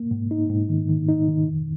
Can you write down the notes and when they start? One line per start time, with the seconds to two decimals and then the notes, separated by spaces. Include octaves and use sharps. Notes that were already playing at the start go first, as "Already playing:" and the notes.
Already playing: A#3
0.11 G#2
0.31 D#4
0.50 G#2
0.69 D#3
0.89 D#3
1.09 D#4
1.28 D#3
1.48 F2